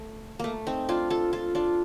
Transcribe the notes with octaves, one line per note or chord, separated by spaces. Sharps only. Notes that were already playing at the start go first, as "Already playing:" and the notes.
Already playing: A3
A3 A#3
C4 D#4
D4 F4
F4 A4
F4 A4
D4 F4